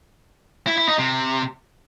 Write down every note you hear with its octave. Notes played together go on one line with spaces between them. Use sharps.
E4
E4
D#4
C3